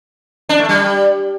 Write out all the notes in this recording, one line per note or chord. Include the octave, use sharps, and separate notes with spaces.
D4
A3
G3